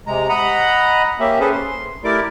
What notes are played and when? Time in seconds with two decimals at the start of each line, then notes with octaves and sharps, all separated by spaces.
0.07 C3 G#3 A#5
0.29 D#5 F#5 A#5 B5
1.20 A#3 C#4 G4 E5
1.40 C#4 G#4 A4 B4 C5
1.52 C6
2.04 A3 E4 G4 A#4 D5 D6